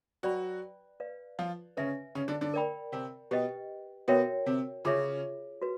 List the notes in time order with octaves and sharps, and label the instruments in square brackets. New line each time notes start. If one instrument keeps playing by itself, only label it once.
[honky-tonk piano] F#3 F#4 [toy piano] B4 D5 G5 B5
[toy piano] B4 D5 F5
[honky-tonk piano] F3 F4
[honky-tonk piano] C#3 C#4 [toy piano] B4 E5 G#5
[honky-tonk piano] C#3 C#4
D3 D4
D3 D4
[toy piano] A#4 D5 G5 B5
[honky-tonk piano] C3 C4
[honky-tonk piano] B2 B3 [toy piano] G4 B4 D#5 G5
[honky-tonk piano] B2 B3 [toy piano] F#4 A#4 C#5 E5 G5
[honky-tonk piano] C3 C4
[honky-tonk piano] C#3 C#4 [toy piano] F4 G#4 C#5 E5
[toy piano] F#4 B4